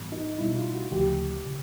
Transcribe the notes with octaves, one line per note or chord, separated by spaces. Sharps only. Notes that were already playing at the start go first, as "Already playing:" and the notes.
Already playing: G#2 E3 G3 B3
D#4
B2 G3 B3 E4
F4
F#4
D2 C#3 F3 A3 G4
C#3